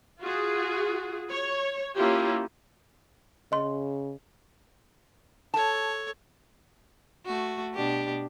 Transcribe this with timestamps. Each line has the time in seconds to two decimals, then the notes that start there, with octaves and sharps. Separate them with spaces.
0.20 F4 F#4 G#4
1.31 C#5
1.95 A#3 C#4 E4 F4 G4
3.52 C#3 D#5 C6
5.54 A4 C#5 A5
7.26 A3 F#4
7.75 B2 D4 G4